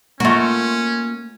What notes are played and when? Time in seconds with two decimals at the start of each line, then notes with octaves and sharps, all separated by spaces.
0.20 A3 A#3 C#4 F4 F#4